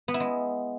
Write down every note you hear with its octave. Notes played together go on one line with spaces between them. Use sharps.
B3
E4
G#3